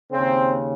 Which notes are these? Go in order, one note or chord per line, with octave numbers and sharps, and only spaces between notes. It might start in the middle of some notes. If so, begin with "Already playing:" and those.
D#2 C#3 C4